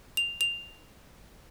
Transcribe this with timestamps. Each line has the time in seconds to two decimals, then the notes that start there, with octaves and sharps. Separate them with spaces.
0.17 F7
0.41 F7